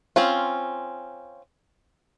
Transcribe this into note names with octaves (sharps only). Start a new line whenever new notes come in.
C4 C#4 F4